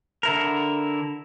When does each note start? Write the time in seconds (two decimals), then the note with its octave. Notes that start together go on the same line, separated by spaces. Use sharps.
0.23 D3 E4 A#4